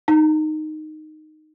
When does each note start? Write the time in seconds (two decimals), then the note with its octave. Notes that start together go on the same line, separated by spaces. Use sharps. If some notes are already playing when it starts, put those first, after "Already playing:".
0.08 D#4